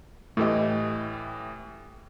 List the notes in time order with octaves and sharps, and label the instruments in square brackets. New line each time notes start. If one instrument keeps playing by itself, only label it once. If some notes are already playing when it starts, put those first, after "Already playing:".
[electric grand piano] A2 E3 G4 [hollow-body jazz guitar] A3 A4 D#5